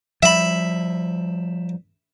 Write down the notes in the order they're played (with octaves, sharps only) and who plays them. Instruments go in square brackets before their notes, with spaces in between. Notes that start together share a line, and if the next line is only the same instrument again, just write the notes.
[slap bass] F3 G3 [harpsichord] E5 B5